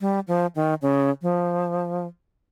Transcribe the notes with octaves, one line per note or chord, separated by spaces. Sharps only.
G3
F3
D#3
C#3
F3